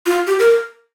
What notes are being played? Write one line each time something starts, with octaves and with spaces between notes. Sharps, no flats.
F4
G4
A#4